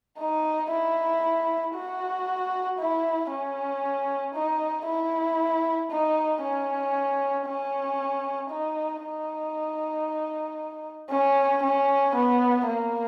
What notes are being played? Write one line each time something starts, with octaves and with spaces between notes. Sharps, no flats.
D#4
E4
F#4
E4
C#4
D#4
E4
D#4
C#4
C#4
D#4
D#4
C#4
C#4
B3
A#3